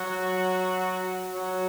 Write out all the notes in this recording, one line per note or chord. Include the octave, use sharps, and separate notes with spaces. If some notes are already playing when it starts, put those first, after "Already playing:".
Already playing: F#3 F#4
F#3 F#4